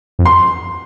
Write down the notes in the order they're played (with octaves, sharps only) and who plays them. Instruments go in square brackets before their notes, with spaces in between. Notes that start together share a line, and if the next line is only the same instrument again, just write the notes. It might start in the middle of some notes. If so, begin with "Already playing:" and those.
[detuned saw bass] F2
[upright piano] C6